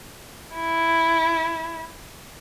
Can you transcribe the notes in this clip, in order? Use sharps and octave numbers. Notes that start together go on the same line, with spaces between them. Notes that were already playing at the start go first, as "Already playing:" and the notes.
E4